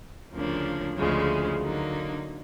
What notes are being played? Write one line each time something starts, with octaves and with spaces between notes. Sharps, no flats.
D2 C#3 F3 A#3 D4
D2 C#3 F3 G#3
D3 F#3 A#3 D#4